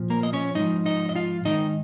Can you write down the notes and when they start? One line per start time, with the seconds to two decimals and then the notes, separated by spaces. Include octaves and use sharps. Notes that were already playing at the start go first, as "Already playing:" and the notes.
Already playing: A#2 F3
0.10 A#3 A#4
0.23 D#5
0.33 C#4 C#5
0.55 G#2 F3 D#4 D#5
0.86 D#4 D#5
1.09 D#5
1.15 F4 F5
1.45 G#2 D#3 D#4 D#5